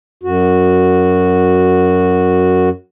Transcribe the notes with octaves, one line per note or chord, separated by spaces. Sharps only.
F#2 F#4